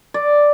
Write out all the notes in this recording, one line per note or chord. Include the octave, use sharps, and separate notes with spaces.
D5